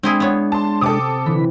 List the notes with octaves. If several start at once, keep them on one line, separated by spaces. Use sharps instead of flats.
G#3 C4 D4 E4 G#4
B3 C#5
A5 C6
C3 A4 D6 D#6
D3 E3 B5